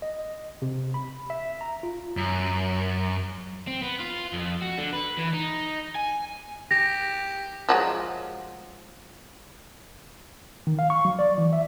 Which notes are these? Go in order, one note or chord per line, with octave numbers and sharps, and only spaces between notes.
D#5
C3
B5
E5
A#5
F4
F#2
C4
B3
F4
F2
F#4
D3
B4
E3
D#4
G#5
G4 A#6
F3 F#3 G#3
D#3
F5
C#6
F#3
D5
E3
E5